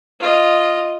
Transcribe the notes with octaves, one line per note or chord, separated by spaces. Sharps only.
F4 D#5